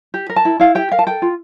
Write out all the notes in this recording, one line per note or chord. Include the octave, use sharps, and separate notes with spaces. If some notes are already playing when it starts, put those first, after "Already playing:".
G4
A#4
A5
E4
E4 F5
G4 G5
A#4 F5
A5
A4 G5
F4